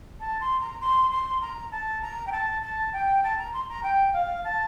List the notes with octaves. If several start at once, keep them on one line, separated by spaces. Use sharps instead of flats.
A5
C6
A#5
C6
C6
A#5
A5
A#5
G5
A5
A5
G5
A5
A#5
C6
A#5
G5
F5
A5